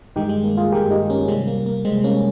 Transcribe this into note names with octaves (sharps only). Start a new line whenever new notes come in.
G2 D#3 G#3 D#4 G4
G#3
A#3
F4 G#4
G2 D#3 G#3 G4 A#4
D#4 G4
A#3 C#4
C3 G3 G#3 C4
A#3
A#3
C3 G3 G#3 C4
A#3 C#4